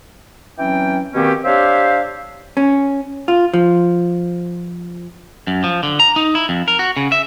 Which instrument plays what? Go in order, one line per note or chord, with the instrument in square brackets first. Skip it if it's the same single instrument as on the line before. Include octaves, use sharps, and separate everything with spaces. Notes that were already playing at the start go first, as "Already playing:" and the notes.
[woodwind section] E3 F#3 C4 C#4 G5
B2 D#3 A#3 C4 C#4 G4
D4 G4 C5 C#5 E5 F5
[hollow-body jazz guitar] C#4
F4
F3
[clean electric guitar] F#2
F3
D3
A#5
D#4
E4
F2
A#4
F#4
C#3
E5